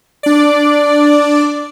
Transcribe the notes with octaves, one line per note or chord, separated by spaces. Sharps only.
D4 D5